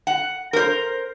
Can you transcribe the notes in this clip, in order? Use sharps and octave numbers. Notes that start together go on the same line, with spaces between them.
F#5
A#4 C5